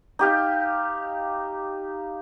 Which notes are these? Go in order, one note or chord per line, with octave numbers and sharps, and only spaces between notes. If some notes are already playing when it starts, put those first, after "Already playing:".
D#4 G4 F5